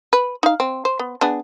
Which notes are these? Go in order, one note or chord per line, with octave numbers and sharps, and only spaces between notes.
B4
D#4 F5
C4
C5
B3
B3 D4 G#4